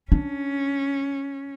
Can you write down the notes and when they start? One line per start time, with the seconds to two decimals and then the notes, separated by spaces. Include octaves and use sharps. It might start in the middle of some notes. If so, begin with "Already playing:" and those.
0.12 C#4 D4